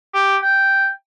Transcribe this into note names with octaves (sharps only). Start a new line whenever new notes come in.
G4
G5